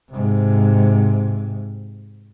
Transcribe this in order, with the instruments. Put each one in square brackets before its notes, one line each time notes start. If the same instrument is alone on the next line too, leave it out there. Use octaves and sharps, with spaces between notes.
[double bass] G#2 C3